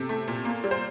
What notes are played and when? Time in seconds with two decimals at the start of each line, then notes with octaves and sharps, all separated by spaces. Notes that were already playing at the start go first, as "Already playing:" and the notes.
Already playing: C3 A4
0.09 A3
0.28 A#2
0.45 A#3
0.64 G3
0.71 C5